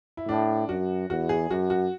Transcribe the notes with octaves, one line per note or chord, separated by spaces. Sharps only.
E4
A2 D4
F#2 F#4
E2 F#4
G#4
F#2 F#4
F#4